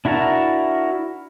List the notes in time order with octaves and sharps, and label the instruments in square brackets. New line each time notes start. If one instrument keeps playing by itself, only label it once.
[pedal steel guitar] D4 E4 F#4 A#4 A5